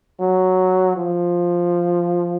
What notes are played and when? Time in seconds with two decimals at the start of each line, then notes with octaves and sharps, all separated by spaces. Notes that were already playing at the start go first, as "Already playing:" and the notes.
0.20 F#3
0.96 F3